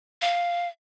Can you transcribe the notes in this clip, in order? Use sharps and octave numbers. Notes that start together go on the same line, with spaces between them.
F5